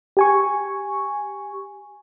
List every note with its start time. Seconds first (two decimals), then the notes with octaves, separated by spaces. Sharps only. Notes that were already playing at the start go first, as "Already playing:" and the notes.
0.17 G4 G#5 C#6